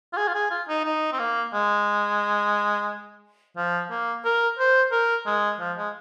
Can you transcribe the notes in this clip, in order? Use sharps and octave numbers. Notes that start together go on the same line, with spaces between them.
F4
G#4
F4
G#4
F4
D#4
D#4
C4
A#3
G#3
F3
A#3
A#4
C5
A#4
G#3
F3
G#3